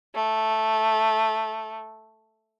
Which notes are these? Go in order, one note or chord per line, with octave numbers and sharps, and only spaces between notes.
A3